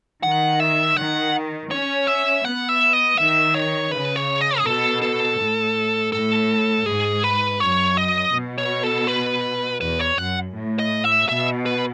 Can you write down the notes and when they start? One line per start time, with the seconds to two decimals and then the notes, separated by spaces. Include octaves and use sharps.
0.23 D#3 F#5
0.60 E5
0.97 D#3 F#5
1.71 C#4 C#5
2.07 E5
2.44 B3 F#5
2.69 E5
2.93 D#5
3.18 D#3 E5
3.55 C#5
3.91 C#3 B4
4.16 C#5
4.41 D#5
4.58 G#4
4.65 B2 A4
5.02 A4
5.39 A2
6.12 A2 A4
6.86 G#2 G#4
7.23 B4
7.60 F#2 C#5
7.97 D#5
8.33 B2
8.58 C#5
8.83 A4
9.07 B4
9.81 E2 B4
10.00 C#5
10.18 F#2 F#5
10.55 A2
10.79 D#5
11.04 E5
11.29 B2 E5
11.66 B4